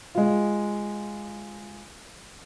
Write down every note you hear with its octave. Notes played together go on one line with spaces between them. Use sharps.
G#3 F4